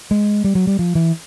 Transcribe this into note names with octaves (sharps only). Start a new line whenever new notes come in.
G#3
G3
F#3
G3
F3
E3